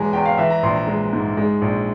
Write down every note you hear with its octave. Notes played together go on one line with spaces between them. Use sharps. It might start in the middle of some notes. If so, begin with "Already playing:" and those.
Already playing: E1 E3 G#3 G#5 A#5
E2 G5
F5
E3 E5
A#5
A#1 C6
A#5
G#3
G#2
G#3
A#1